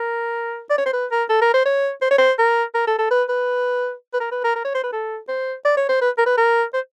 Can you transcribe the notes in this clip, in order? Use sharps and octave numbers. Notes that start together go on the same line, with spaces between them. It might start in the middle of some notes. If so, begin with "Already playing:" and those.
Already playing: A#4
D5
C#5
C5
B4
A#4
A4
A#4
C5
C#5
C5
C#5
C5
A#4
A#4
A4
A4
B4
B4
B4
A#4
B4
A#4
A#4
C#5
C5
B4
A4
C5
D5
C#5
C5
B4
A#4
B4
A#4
C5